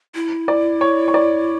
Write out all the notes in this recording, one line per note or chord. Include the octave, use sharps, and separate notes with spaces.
E4
D5
C#5
C#5
D5